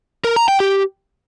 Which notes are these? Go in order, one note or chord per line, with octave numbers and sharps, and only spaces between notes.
A#4
A#5
G5
G4